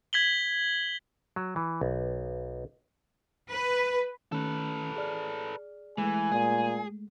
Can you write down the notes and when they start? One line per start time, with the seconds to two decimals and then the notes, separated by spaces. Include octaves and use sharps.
0.13 G#6 B6 F#7 G7
1.36 F#3
1.56 E3
1.81 B1
3.50 B4
4.32 D#3 A3 C#4 A4 B4
4.96 G#4 D5 F6
5.98 E3 G#3 A3 G#5
6.32 A#2 G#4